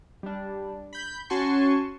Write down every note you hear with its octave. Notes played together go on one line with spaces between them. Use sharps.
G3 D4
B5 G6
C#4 F#4 G#5 A5 C6 C#6